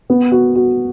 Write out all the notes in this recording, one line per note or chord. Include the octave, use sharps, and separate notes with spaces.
B3
F#4
F#4